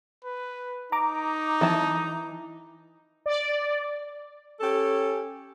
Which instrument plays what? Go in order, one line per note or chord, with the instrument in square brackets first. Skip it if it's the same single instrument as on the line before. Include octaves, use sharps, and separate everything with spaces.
[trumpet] B4
[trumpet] D#4 [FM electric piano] A#5 D6
[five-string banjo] E3 A5
[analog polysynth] D5
[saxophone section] C#4 G4 A4